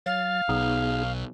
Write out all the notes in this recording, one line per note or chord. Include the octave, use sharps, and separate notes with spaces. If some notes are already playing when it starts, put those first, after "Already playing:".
F#3 F5 A6
B1 B3 D#4 G#4